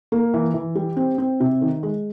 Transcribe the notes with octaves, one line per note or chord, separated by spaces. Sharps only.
A#3
E3
E3
G3
C4
C4
C3
D#3
G#3